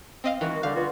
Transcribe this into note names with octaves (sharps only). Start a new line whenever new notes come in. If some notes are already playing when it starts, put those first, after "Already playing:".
C4 D#5 F5
D#3 E3 G#3 F#4
D3 G3 F5
B3 F4 F#4